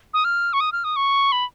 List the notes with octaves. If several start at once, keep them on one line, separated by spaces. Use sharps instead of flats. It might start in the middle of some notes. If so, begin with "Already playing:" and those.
D#6
F6
C#6
D#6
F6
D#6
C#6
B5